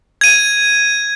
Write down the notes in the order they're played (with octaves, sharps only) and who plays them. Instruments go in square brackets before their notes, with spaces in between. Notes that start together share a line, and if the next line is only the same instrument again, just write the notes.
[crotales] G#6 D#7